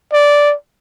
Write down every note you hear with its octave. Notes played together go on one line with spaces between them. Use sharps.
D5